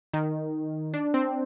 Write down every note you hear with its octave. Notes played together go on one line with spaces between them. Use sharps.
D#3
D4
C4